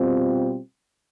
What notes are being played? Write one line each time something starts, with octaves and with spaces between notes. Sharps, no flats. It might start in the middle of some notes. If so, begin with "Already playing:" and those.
Already playing: B2 G3 C4 F4